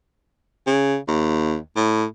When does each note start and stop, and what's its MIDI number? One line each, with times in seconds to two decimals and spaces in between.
0.67 0.97 49
1.08 1.57 39
1.76 2.04 45